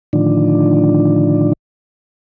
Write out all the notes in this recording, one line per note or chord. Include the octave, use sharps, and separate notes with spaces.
A2 D3 D#3 F3 D4